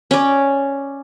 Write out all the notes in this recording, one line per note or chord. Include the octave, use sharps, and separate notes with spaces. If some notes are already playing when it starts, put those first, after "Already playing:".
C#4 D5